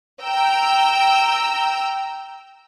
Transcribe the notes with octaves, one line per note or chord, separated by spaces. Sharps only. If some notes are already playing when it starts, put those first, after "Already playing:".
G5 A#5 E6